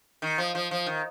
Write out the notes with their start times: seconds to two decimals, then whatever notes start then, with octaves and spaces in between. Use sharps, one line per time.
0.22 D#3
0.38 F3
0.55 F3
0.71 F3
0.86 D#3